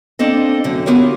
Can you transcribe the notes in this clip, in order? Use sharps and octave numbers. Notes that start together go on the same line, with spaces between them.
A#3 C4 D4 A4 D#5
F#2 D3
B3 F4 G4 A#4 C#5